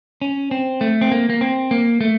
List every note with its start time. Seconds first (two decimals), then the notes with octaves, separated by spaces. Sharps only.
0.22 C#4
0.51 C4
0.81 A3
1.01 C4
1.12 A#3
1.30 A#3
1.41 C4
1.71 A#3
2.01 A3